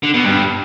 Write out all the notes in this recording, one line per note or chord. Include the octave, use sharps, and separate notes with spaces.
D3
B2
G2